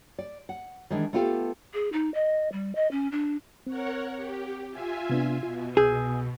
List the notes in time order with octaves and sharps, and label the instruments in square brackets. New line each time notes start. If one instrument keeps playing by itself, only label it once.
[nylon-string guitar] D5
F#5
D#3 E3 G#3 D4 E4
A3 B3 F4 G4 A4
[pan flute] G#4
D#4
D#5
G3
D#5
C#4
D4
[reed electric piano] C4 [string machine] A#4 C#5 F#5
[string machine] G4
F4 E5 G#5
[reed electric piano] C3 B3 D4
[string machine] B2 [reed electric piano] F4
[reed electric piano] C2 E6 G6 [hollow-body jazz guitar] G#4